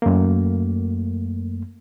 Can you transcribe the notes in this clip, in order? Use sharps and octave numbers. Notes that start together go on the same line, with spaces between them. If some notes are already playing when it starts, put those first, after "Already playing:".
F#2 A3 A#3